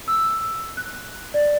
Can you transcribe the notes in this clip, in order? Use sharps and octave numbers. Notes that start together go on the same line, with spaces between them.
E6
F#6
D5